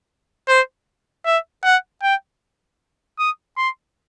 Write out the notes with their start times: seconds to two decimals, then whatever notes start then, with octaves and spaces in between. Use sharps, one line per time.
0.48 C5
1.26 E5
1.64 F#5
2.03 G5
3.19 D#6
3.57 C6